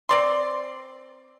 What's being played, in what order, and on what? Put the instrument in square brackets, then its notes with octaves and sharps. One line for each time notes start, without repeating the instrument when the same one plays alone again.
[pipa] C4 D5 C6